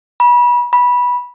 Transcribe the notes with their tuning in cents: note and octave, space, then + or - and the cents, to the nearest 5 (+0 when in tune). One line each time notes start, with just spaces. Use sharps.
B5 -30
B5 -15